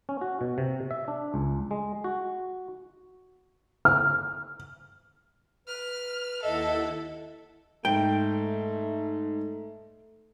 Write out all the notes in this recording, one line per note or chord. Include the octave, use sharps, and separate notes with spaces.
C#4
F#4
B2
C3
E5
D4
C#2
G#3
F#4
F6
B4 F6
D#2 E4 A4 D#5 E5 F#5
G#2 A3 G5